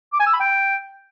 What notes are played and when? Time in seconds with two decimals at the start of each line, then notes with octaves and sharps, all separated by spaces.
0.13 D6
0.20 G#5
0.27 E6
0.33 B5
0.40 G5